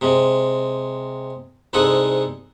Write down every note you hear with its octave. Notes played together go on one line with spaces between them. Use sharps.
C3 G#3
C2 G#2 G#3 A4 F#5 D#6